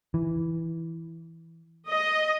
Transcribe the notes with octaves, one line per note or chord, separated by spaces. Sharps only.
E3
D#5